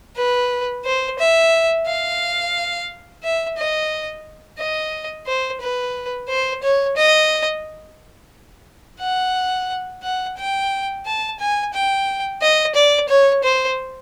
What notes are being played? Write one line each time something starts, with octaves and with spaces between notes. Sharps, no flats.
B4
C5
E5
F5
E5
D#5
D#5
C5
B4
C5
C#5
D#5
F#5
F#5
G5
A5
G#5
G5
D#5
D5
C#5
C5